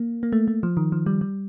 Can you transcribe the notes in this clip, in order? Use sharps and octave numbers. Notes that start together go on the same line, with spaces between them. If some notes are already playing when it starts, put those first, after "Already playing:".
Already playing: A#3
A#3
A3
A3
F3
D#3
F3
G3
G3